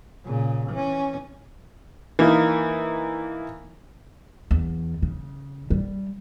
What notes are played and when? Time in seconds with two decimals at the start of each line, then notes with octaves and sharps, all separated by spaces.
0.24 A#2 C#3
0.70 E3 C#4
2.19 E3 A#3 D#4
4.51 E2
5.02 C#3
5.70 G3